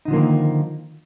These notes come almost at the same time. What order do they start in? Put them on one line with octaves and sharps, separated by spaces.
D#4 D3 F3 A#3 D#3